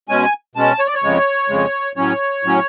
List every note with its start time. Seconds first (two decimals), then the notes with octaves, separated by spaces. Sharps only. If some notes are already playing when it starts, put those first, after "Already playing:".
0.09 B2 G#3 C#4 G#5
0.55 B2 G#3 C#4 A5
0.79 C#5
0.87 D5
0.95 C#5
1.03 F2 C#3 G#3
1.49 F2 C#3 G#3
1.96 A2 F#3 C#4 C#5
2.43 A2 F#3 C#4